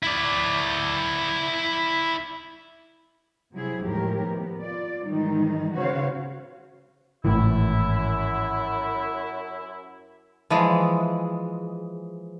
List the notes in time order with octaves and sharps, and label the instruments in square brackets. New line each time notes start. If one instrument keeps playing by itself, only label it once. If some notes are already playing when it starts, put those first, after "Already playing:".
[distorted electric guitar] E4 D5
[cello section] C3 F#3 E4 G#4
D#2 A2 F3 G#3 G4 A#4
B3
F4 D5
G#2 D#3 E3 G3 G#3 D#4
C#3 B3 F#4 C5 C#5 F5
[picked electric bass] G#1 A2 E3 [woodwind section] F#2 E4
[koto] E3 F3 G#3